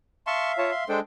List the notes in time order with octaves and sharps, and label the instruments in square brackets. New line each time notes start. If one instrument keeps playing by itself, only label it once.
[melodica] E5 F5 [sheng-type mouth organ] A5 C6 C#6
[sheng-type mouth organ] F4 C#5 A5
C6
[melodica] G#3 D4 [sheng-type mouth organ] A4 C5 G5